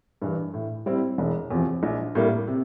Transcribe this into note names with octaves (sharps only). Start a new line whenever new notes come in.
G2 E3
A2
G3 C4 E4
E1
E2 C3 F3
A#1
A2 G3 A#3
C3